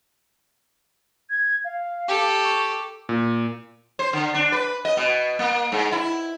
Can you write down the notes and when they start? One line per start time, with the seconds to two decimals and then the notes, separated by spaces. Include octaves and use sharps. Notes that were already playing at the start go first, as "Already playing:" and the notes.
1.30 G#6
1.64 F5
2.08 G4 A4
2.44 C#6
3.09 A#2
3.99 C5
4.13 D3
4.34 D4
4.52 B4
4.85 D#5
4.97 B2
5.39 A#3
5.72 G#2
5.92 E4